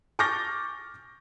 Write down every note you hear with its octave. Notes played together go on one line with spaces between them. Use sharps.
C#6 D6 F6 G6 A6 A#6